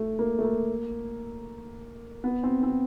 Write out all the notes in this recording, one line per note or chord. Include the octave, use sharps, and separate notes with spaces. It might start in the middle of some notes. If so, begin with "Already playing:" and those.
Already playing: A3
A#3
A3
A#3
B3
C4
C4